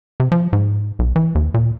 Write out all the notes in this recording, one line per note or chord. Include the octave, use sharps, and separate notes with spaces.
C3
F3
G#2
B1
E3
D#2
A#2